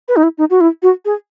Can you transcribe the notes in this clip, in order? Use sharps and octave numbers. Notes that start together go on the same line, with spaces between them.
B4
D#4
E4
D#4
F#4
E4
F#4
G#4